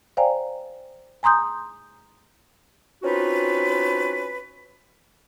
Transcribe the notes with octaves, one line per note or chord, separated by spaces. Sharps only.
C5 D5 F5 G5 G#5 A#5
G#5 A#5 C6 D#6 G6
C4 C#4 D#4 F4 F#4 B4